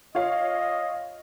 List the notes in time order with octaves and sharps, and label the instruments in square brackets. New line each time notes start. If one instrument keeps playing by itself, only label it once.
[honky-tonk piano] F4 C#5 F5 [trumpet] D#5